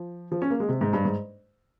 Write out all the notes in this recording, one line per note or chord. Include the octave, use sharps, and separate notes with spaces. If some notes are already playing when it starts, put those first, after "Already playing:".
Already playing: F3
F3
C#4
A#3
G#3
C3
G#2
G2
G#2